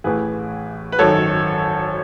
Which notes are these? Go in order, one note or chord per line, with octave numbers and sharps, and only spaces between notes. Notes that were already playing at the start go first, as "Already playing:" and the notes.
A1 A2 E3 G#4 B4
B4
G#1 F#2 D#3 A4 C#5